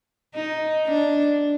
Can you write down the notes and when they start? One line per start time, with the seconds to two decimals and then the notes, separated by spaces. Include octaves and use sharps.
0.34 D#4
0.86 D4